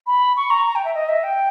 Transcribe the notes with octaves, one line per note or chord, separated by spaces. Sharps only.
B5
C#6
A#5
A#5
G5
E5
D#5
E5
G5